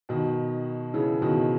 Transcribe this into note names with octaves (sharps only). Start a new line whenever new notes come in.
B2 D#3
C#3 E3
B2 D#3